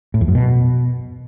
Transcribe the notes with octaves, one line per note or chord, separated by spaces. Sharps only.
A2
E2
F#2
B2